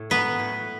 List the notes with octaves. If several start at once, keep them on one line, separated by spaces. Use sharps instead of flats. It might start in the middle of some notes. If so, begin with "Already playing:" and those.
Already playing: A2
F#3 B3 B4
A2